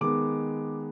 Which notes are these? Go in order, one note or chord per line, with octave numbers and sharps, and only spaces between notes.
D#3 G#3 B3 D6